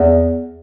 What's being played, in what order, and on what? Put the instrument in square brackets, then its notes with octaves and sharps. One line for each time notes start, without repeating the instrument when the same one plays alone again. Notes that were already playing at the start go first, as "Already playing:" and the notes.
Already playing: [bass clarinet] E2